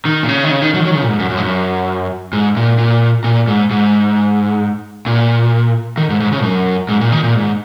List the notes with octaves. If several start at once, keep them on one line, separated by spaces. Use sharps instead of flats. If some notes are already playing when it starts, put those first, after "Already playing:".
D#3
A#2
C#3
D#3
C#3
D#3
F#3
D#3
F#3
D#3
C#3
A#2
G#2
F#2
F#2
G#2
F#2
G#2
A#2
A#2
A#2
G#2
G#2
A#2
D#3
G#2
G#2
C#3
F#2
G#2
A#2
D#3
A#2
G#2